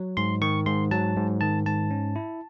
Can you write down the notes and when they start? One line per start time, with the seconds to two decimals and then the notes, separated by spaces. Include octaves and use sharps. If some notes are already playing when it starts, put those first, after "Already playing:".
Already playing: F#3
0.17 G#2 C6
0.41 D#3 C#6
0.66 G#2 C6
0.91 F#3 A5
1.17 G#2
1.41 D#3 A5
1.66 G#2 A5
1.91 C#4
2.16 E4